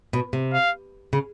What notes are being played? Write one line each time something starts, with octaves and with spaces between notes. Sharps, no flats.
B2
C3
F5
C#3